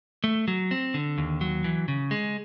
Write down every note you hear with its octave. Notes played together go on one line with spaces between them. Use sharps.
A3
F#3
C4
D3
D#2
F#3
E3
C#3
G#3